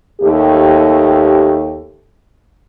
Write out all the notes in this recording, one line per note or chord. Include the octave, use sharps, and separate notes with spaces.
D#2 A3 G4